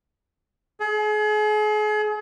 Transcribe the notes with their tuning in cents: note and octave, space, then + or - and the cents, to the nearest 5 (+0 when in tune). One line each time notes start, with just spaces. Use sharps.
G#4 +35